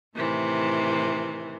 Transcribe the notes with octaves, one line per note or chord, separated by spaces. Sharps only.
A2 C3 D#3 E3